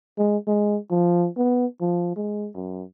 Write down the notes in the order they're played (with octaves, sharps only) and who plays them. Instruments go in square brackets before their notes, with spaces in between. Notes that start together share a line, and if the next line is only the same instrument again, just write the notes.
[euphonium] G#3
G#3
F3
B3
F3
G#3
F#2